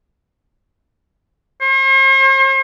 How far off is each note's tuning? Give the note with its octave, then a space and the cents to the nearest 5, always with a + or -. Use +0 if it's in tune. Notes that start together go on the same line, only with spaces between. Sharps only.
C5 +45